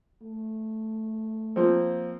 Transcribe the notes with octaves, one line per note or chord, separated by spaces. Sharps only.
A3
F3 A#3 C4